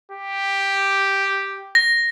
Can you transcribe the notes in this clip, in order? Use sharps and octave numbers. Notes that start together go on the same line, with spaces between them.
G4
A#6